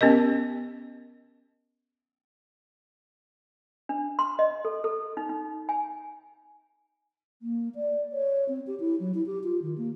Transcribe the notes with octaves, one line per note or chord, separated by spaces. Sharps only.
B3 C#4 G4 A#4 D#5
D4
C6
D#5
A4
A4
D#4
D#4
G#5
A#3
D5
C#5
C4
G4
E4
F#3
E4
G4
F4
D#3
A#3